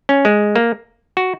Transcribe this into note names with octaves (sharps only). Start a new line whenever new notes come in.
C#4
G#3
A#3
F#4